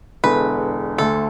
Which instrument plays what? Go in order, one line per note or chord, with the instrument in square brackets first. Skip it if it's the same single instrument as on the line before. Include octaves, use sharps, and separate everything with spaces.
[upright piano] E1 E2 D3 [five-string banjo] B4
[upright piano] D2 D3 A3 [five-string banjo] A4